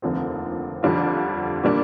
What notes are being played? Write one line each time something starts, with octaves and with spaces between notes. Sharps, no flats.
F1 D#2 D3 F3 C4
F2 D3 G3 D4 F4
A#2 G3 D4